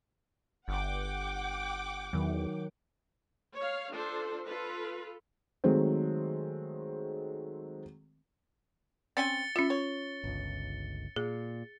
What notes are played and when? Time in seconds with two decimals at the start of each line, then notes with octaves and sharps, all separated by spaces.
0.68 G1 F#5 G5 D6
2.13 E2 D#3 F#3
3.54 C#5 F5
3.93 D4 F4 A4 C5
4.48 F4 A4 B4
5.64 D#3 F#3 G#3 A3 C4
9.17 C4 C#4 G#5 A6 C#7 G7
9.56 C#4 F4 E5
9.70 C#5
10.24 G1 C#2
11.16 A#2 G#4